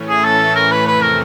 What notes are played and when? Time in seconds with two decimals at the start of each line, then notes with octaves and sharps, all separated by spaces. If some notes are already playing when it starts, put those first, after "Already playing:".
Already playing: A2 E3 A3 C#4
0.09 G#4
0.24 A4
0.55 A#4
0.71 B4
0.87 F2 C3 E3 A3 B4
1.02 A#4